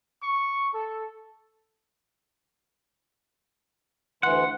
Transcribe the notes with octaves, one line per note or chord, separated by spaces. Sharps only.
C#6
A4
D2 E3 F#5 C6